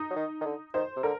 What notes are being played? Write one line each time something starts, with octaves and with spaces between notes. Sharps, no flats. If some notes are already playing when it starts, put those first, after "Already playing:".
Already playing: D#4
F#3
D#3
D#3
D3
D#3 C5
C3
D3 A#4